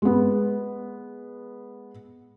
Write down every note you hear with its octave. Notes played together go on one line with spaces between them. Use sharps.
G#3 B3